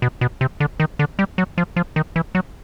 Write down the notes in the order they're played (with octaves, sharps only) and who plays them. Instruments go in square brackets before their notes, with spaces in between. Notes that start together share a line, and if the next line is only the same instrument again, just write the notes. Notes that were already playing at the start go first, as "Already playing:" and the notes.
[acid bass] B2
B2
C3
D3
D#3
D3
G3
F#3
F3
F3
D#3
E3
F#3